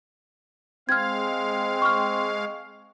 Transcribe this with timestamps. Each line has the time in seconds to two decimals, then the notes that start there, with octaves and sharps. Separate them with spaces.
0.89 G#3 C4 F5 F6 G#6
1.82 C#6 F6